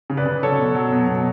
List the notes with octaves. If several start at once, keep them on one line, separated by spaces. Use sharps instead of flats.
C#3
B4 D5
C#3
F#3 A4 C#5
B2
F#3
B2
B2